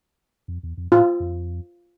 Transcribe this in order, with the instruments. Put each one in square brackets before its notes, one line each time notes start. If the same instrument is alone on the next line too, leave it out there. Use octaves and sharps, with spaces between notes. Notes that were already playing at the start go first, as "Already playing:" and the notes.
[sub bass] F2
E2
F2
[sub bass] A2 [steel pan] F4
[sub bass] F2